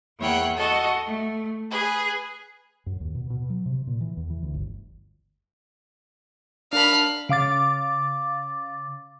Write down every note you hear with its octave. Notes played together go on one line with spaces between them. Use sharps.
E2 E3 A#3 C#5 F#5 G5
F#4 A4 D#5 A5
A3
G#4 B4
F#2
D#2
B2
B2
F#3
C3
A#2
E3
E2
E3
D2
G1
D4 A#4 F5 A5 B5
C#3 F5 D6 A6